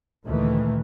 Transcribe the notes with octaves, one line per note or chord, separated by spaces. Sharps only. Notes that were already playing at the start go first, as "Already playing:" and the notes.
D2 A#2 D#3 E3 A3